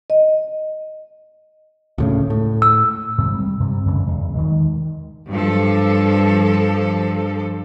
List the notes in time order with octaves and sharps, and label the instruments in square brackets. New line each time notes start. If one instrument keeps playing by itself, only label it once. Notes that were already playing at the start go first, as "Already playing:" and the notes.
[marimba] D#5
[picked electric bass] D2 A2 C#3
A2
[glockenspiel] E6
[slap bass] G#2 C3 D#3 G3
G3
G2 C3 G3
F#2 C#3 E3 G#3
E2
D2 D#3 E3 G#3
[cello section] G2 F3 A4